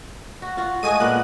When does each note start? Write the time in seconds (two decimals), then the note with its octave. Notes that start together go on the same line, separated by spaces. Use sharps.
0.42 F#4
0.57 F4 F#4
0.83 G#3 A3 F#4 G#5 D#6 D#7
1.00 A#2 B3 A#4 F#6